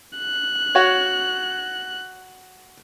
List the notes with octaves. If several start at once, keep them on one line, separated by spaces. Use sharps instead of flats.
F#6
F#4 C#5